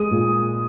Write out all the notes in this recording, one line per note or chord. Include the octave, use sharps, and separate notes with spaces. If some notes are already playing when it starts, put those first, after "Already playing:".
Already playing: G#3 D#6
A#2